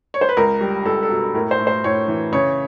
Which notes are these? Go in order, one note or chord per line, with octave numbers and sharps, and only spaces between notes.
C#5
C5
B4
C#2 A#4
G3
C#2 A4
A4
B2
A2 A#4
C5
A2
C5
A2 C#5
E3
C#3 C#5